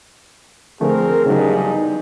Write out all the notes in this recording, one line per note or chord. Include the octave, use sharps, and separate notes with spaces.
D3 F3 A3 C4 G#4 A#4
E2 G2 C#3 F#3 D#4